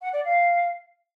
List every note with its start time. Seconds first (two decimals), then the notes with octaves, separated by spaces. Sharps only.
0.01 F#5
0.13 D5
0.24 F5